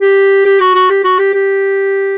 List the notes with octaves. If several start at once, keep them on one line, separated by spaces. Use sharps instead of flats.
G4
G4
F#4
F#4
G4
F#4
G4
G4